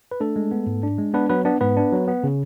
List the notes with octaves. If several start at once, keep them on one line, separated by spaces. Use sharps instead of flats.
B4
A3 D4 A4
G#3
B3
G#2
D4
G#3
B3 D4 B4
F#3 B3 B4
B3 D4 D5
G#2 B3 B4
D4
F#3
B3
C#3